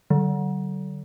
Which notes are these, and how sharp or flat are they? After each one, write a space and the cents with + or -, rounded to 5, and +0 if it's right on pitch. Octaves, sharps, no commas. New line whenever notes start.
D3 -5 F#3 +45